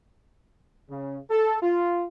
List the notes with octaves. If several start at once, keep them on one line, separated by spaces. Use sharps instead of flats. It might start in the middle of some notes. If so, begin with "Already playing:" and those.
C#3
A4
F4